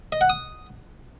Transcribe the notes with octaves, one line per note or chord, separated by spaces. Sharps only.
D#5
F#5
D#6